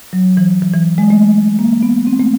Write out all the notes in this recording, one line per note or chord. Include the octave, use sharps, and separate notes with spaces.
F#3
E3
E3
E3
G#3
A3
A#3
B3
C4
A3